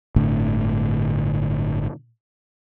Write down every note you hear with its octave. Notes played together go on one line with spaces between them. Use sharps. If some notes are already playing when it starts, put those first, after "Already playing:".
G1 A2 D3